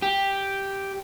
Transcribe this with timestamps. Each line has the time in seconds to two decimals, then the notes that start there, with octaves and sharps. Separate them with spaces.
0.02 G4